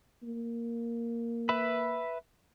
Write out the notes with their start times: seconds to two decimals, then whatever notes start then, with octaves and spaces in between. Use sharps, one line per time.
0.23 A#3
1.49 B4 E5 B5